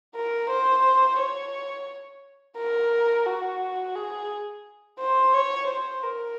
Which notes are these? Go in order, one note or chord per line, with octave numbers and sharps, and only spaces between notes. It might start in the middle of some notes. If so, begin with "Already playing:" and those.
A#4
C5
C#5
A#4
F#4
G#4
C5
C#5
C5
A#4